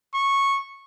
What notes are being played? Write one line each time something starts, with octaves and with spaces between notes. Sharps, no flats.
C#6